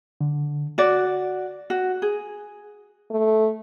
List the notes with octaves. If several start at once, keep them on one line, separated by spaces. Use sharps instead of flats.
D3
F#4 D5
F#4
G#4
A3